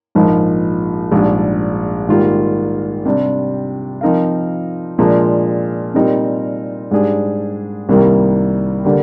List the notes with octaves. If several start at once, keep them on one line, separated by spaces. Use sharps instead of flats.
A#1 G#2 F3 A#3 D#4
A#1 G#2 G3 D4
G#2 D#3 G3 A#3 F4
C3 G3 D4
F3 C4 D#4 A#4 F5
A#2 F3 G#3 D4
A#2 G3 C4 D#4 A#4
G#2 G3 D4 G#4
C2 C3 D#3 G3 A#3
D3 G3 A#3